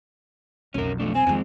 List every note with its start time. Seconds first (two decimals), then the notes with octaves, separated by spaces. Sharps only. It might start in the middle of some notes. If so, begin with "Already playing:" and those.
0.74 B1 F2 C#4 A#4
1.00 F3 A3 D4
1.15 C4 G#5
1.27 F2 D#3 G#3 C4